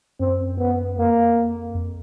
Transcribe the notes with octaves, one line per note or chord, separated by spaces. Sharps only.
F#2 C4
B3
F2 A#3
F2